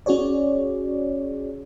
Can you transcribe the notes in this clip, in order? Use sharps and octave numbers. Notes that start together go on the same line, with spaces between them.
C#4 F#4 G#4 C#5 D5